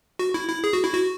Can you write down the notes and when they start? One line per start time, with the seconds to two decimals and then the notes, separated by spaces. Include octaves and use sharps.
0.19 F#4
0.34 E4
0.49 E4
0.64 G#4
0.73 F#4
0.84 E4
0.94 F#4